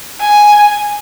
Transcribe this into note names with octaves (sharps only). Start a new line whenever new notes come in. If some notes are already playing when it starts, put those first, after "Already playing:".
G#5